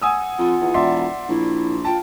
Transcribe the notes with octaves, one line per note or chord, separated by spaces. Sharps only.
F#5 G#5 D#6 E6
F2 F4
E2
E1 D5 E5 C6
A#1 E4
F4 G5 A5